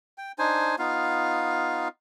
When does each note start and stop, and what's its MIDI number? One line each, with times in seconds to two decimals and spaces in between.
0.18 0.32 79
0.38 0.76 62
0.38 0.76 63
0.38 0.76 72
0.38 0.76 80
0.79 1.88 59
0.79 1.88 63
0.79 1.88 65
0.79 1.88 77